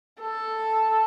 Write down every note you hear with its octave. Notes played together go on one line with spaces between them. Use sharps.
A4